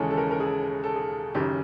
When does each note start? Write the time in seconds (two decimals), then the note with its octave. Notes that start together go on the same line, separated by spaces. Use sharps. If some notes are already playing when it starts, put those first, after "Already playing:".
Already playing: D#2 C#3 E3 G#3 C#4 A4
0.11 A4
0.17 A#4
0.31 A#4
0.40 G#4
0.43 A4
0.84 A4
0.96 G#4
1.34 F#1 F#2 D#3 G4